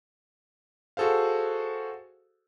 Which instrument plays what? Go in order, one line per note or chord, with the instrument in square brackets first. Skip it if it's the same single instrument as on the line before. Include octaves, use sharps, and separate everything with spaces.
[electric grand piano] F#4 G#4 A4 C5 F5